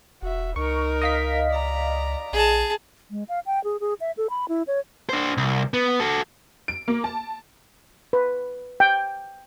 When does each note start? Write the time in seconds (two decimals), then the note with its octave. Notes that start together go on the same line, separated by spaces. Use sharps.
0.22 E1 F#4 E5
0.56 C#2 D#4 A#4 C#6
1.01 D#5 F5 B6
1.51 D5 A#5
2.33 A#1 G#4 A5
3.11 G#3
3.29 F5
3.46 G5
3.64 G#4
3.80 G#4
4.00 E5
4.17 A4
4.30 B5
4.48 E4
4.67 C#5
5.09 D4 C5
5.37 C2
5.74 B3
6.00 F#4 A4
6.68 D7
6.88 A#3
7.04 A5
8.13 B4
8.80 G5